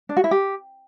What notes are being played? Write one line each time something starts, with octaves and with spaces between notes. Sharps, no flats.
D4
F#4
E4
G4